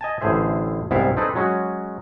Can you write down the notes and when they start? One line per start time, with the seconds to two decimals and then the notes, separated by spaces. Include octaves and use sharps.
0.01 D#5 G#5 A5
0.21 A1 A2 D3 G#4 C5 E5
0.91 C2 G#2 B3 E4 E5 F5
1.17 C4 D4 D#4 G#4 A4 B4
1.35 F#3 G#3 C#4 F#4